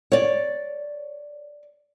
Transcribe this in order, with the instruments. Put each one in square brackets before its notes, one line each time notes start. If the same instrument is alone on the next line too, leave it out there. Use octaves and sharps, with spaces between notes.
[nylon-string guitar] C#5 D5